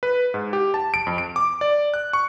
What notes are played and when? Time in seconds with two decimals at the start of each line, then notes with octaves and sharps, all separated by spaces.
0.03 B4
0.34 G#2
0.53 G4
0.74 A5
0.94 D7
1.07 F2
1.18 D7
1.36 D6
1.61 D5
1.94 F#6
2.13 C#6